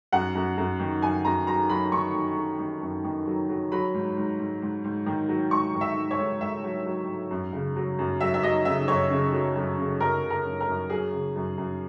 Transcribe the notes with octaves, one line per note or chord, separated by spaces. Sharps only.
F#2 F#5
F#2
F#2
D#3
F#2 G#5
F#2 A#5
F#3 A#5
F#3 B5
D#3 C#6
D#3
F#3
D#3
F#2
D#3
F#3
F#3
F#3 B5
G#2
G#2
G#2
G#2
G#2
D#3
F#3
G#2 C#6
D#3
E5
G#2
C#5
G#2
G#2 E5
F#3
F#3
G#2
F#2
C#3
F#3
F#2
F#3 E5
E5
F#3 D#5
C#3 E5
F#2 C#5
C#3
F#3
F#2
C#3
F#2 A#4
C#3
A#4
F#2
A#4
F#2
F#3 G#4
C#3
F#2
F#2